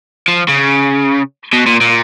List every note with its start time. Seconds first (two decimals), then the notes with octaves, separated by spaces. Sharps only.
0.28 F3
0.48 C#3
1.53 B2
1.67 A#2
1.81 A#2